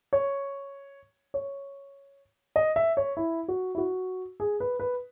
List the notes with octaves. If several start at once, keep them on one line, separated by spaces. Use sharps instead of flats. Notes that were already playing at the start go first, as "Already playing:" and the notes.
C#5
C#5
D#5
E5
C#5
E4
F#4
E4
F#4
G#4
B4
B4